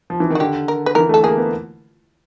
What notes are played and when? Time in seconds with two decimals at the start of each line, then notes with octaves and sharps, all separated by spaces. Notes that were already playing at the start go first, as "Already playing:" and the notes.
0.10 F3
0.20 E3
0.30 D#3
0.35 F#4
0.40 D3 G4
0.68 A#4
0.86 B4
0.95 E3 A#4
1.09 A3 A4
1.23 A#3 G#4
1.37 B3